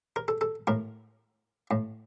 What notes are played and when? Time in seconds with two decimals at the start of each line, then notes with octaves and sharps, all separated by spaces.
0.16 A#4
0.28 A4
0.41 A4
0.67 A2 A#4
1.71 A2